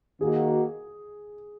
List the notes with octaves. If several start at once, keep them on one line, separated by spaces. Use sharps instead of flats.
D#3 A#3 F#4 G#4